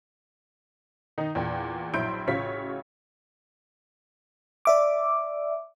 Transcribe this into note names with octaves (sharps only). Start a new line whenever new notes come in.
D#3 D#4
E2 A#2 D4 G5
A#1 F#3 E4 C6 G6 D7
A1 C#3 F4 F#4 C#5 B6
D5 E5 D6